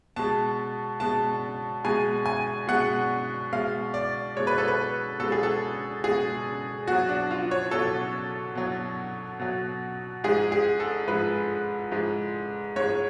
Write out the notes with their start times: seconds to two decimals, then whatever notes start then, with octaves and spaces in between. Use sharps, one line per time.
0.16 B2 G#3 A5
1.00 B2 G#3 A5
1.85 B2 G#3 G#5
2.26 G#5
2.67 B2 G#3 F#5
3.53 B2 G#3 F5
3.94 D5
4.36 B2 G#3 C#5
4.47 B4
4.58 A4
4.68 B4
5.19 B2 G#3 A4
5.32 G#4
5.43 A4
6.04 B2 G#3 G#4
6.87 B2 F#3 F#4
7.09 D4
7.31 F4
7.51 C#5
7.71 B2 F#3 A4
8.55 B2 F#3
9.39 B2 F#3
10.24 G#2 F3 G#3 G#4
10.52 G#4
10.80 A4
11.08 G#2 F3 G#3 B4
11.92 G#2 F3 G#3
12.76 G#2 F3 G#3 C#5